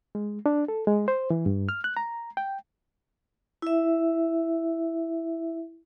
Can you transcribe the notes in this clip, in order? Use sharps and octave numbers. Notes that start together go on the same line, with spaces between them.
G#3
D4
A4
G#3
C5
E3
G2
F6
F#6
A#5
G5
E4 E5